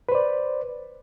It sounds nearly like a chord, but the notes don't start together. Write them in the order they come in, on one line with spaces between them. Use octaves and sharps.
B4 C5 D5